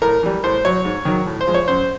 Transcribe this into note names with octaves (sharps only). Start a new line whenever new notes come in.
A2 A#4
E3 G3
A2 C5
F#3 C#5
G#2
D#3 F#3
A2
C5
F3 G#3
C#5
F#2 C5